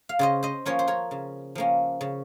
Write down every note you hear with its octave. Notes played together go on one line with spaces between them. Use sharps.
F5
C#3 C5 D#5
C5 D#5
F3 A#3 C#4 A#4 C#5
C5
A#4 C#5
C#3
F3 A#3 C#4
C#3